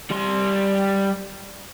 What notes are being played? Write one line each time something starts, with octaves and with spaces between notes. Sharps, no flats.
G3 C6